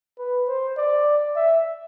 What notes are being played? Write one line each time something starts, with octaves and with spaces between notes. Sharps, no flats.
B4
C5
D5
E5